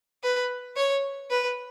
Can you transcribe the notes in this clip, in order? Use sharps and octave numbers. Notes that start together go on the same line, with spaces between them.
B4
C#5
B4